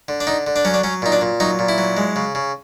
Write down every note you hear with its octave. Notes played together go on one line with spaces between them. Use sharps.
D3
D4
D3 D#4
D3
D4
F#3 C#4
D4
F#3 C#4
A#2 D#4
D4
A#2
F#3 D#4
A#2
E4
F#3
G#3
C#3
C#3